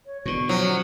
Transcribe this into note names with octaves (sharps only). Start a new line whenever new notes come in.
C#5
B2 D3 C#6
F3 F#3 C#4